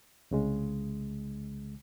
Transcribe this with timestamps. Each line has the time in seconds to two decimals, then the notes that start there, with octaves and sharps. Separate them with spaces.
0.31 C2 C#3 G#3